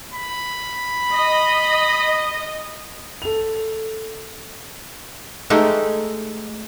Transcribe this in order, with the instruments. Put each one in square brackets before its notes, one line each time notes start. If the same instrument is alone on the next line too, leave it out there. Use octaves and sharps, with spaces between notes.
[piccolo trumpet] B5
[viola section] D#5
[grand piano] A4 F7
[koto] G#3 A3 D#4 G4